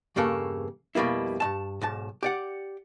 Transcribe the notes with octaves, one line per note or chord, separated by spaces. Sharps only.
E2 G2 C#3 A#3 A4
F2 B2 G3 A#3 E4
G2 G#3 A5
B1 G#2 A5
G4 D5 F#5